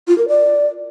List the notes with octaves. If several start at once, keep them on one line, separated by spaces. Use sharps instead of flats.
F4
A#4
D5